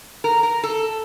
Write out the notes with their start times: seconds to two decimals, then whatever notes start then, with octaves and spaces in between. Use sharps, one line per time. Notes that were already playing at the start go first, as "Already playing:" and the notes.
0.24 A#4
0.43 A#4
0.63 A4